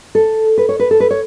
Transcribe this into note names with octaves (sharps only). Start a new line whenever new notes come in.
A4
B4
C#5
B4
A4
B4
C#5